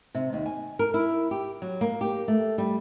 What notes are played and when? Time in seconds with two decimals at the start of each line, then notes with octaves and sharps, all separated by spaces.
0.15 C3
0.33 D#2
0.46 G#5
0.79 A#4
0.94 E4
1.31 G4
1.62 F#3
1.81 A#3
2.01 G4
2.28 A3
2.58 G3